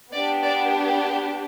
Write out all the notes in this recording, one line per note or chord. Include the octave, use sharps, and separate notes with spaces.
B3 D4 G4 D5
D5